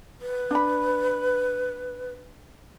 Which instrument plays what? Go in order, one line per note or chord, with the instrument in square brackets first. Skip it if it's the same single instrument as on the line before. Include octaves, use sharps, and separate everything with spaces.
[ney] B4
[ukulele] D4 B5